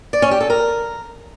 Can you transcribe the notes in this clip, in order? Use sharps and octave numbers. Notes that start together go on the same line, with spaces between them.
D5
C#4
G4
A4
A#4